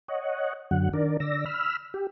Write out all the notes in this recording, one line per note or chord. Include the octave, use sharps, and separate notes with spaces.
C#5 D#5 F#5
F#2 D3 F#3 F#5
D#3 D4 A#4 D5
D3 D5 E6 A#6
B5 E6 F6
G4